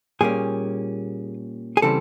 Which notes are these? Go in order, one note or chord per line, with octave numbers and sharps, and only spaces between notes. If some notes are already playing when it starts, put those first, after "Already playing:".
A#2 G3 A#3 C#4 G#4
G#4
C#3 E3 G3 C4 A4